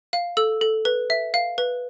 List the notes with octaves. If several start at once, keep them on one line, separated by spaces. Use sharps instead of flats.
F5
A4 E6
A4
B4
E5
F5
B4